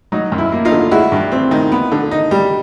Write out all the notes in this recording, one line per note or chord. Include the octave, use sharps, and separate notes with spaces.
F#3 D#4
F#2
E4
A#3
D#4 F4
D3
G#3 E4 F#4
G2
C4
D#3
B3
D3
D#4
G3